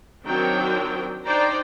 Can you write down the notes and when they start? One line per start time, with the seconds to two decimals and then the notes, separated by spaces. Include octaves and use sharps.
0.25 D#3 F#3 C4 D4 A#4 G5
1.25 D4 D#4 C5 D5 G5 A#5